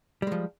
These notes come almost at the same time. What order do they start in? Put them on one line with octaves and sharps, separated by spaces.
G3 G#3 F3